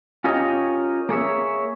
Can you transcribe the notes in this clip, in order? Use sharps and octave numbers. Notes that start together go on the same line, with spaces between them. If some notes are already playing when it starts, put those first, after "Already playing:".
C#4 F4 G4 A#4 C#5 D#5
A#3 G#4 C#5 E5